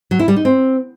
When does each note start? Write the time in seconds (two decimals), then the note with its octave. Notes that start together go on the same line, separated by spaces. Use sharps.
0.11 F#3
0.19 E4
0.28 G3
0.36 D#4
0.45 C4